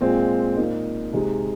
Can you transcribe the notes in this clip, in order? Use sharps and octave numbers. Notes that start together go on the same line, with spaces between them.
A#2 G#3 C4
A#2 A#3 D#4
C3 G#3 D#4